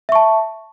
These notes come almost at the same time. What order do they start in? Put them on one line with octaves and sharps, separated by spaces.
E5 C#6 A5